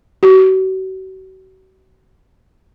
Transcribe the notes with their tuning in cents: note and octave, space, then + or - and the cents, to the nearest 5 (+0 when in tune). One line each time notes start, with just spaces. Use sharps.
F#4 +40